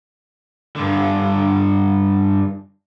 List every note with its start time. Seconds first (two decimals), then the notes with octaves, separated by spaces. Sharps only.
0.76 G2 D3